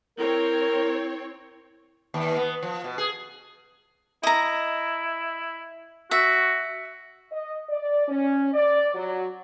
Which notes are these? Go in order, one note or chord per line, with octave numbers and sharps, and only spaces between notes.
C4 E4 A#4 C#5
D#2
B3
F3
B2
G#4
E4 D#5 A#5
F#4 E5
D#5
D5
C#4
D5
F#3